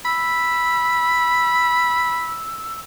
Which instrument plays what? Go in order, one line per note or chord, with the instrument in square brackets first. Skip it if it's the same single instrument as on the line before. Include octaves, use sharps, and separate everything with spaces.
[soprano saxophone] B5 [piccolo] E6